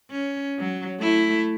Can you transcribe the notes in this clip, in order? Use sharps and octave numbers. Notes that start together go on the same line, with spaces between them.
C#4
F#3
A3 E4